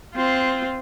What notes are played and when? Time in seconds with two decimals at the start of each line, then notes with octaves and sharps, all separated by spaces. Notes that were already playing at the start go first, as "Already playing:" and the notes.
0.15 C4 F4